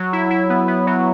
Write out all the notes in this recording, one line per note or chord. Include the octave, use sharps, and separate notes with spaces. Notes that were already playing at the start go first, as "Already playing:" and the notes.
Already playing: F#3
E4
E4
B3
B3
F#3